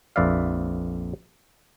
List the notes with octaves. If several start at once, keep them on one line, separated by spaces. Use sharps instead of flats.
A#1 F2 B4 D5 E5 F5